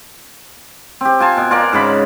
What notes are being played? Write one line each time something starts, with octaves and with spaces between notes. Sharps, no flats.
C4 G4
F4 G#5 A5
B2
F4 A#4 D5 F#5
G#2 C#3 B5 D6